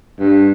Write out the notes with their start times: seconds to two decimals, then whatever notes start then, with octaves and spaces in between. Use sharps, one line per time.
0.19 G2